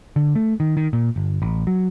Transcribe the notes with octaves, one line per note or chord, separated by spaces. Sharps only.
D3
A3
D#3
D#3
A#2
G1
A1
F#3